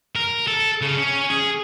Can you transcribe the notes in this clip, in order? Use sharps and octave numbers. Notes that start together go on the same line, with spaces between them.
A#4
A4
C#3
C#4
G#4